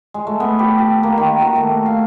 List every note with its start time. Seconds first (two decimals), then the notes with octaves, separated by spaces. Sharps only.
0.14 G#3
0.27 A3
0.40 B3
0.59 G4
0.79 G4
1.03 A#3
1.18 D#3
1.41 F#4
1.56 A3
1.86 F5